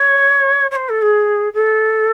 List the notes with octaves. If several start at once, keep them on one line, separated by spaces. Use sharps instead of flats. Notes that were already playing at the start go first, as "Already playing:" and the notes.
Already playing: C#5
C#5
C5
A4
G#4
A4